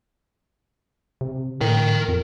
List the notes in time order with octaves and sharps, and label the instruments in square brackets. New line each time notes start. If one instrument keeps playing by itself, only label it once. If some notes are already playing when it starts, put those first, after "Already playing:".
[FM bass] C3
[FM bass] A2 [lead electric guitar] A#4 G5
[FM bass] F2